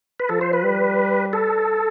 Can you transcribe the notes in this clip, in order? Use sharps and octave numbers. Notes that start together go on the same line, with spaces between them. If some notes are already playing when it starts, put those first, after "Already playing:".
B4
F3 A4
C5
B4
G3
A4